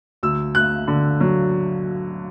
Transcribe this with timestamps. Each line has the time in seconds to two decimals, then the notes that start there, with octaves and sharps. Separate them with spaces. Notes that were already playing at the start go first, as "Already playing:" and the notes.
0.23 D2 E6
0.55 D2 F#6
0.88 D3
1.20 F#3